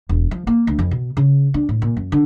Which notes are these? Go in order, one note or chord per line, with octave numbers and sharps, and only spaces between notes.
E1
F3
A#3
D2
F2
B2
C#3
D4
A2
A#2
F#2
D3